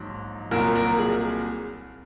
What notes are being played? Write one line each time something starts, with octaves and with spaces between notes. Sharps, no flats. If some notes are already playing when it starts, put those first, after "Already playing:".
Already playing: A#1 G#2 F#3
C2 A#2 F#3 A#4
A#4
G#4